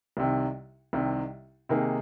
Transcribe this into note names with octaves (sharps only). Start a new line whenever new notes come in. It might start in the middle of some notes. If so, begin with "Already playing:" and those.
C2 C3 D#3
C2 C3 D#3
C3 D#3 A#3 D#4 G#4